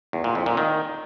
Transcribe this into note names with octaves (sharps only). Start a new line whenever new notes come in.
E2
A#2
F2
A#2
D#3